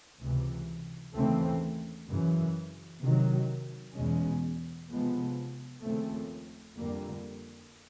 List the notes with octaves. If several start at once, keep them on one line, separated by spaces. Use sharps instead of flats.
C#2 C3 E3
D#2 C#3 E3 A3 C4
F#2 C#3 E3
C3 D#3 F#3
E2 B2 G#3 C#4
C3 F3 G#3 B3
D#2 C#3 F3 A3 C4
F2 D3 G3 A#3